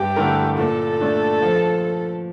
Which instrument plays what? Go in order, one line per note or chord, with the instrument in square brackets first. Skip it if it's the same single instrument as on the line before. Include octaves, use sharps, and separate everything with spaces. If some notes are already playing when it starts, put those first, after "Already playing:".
Already playing: [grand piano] G2 [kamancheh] G4
[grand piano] D3 A3 E4 A#4
[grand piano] A#2 [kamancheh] A4
[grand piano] A3 D4
F3